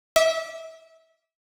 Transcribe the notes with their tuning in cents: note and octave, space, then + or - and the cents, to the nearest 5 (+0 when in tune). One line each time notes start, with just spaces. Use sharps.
E5 -25 D6 +0